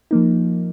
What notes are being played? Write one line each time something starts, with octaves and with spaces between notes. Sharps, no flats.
F3 A#3 D#4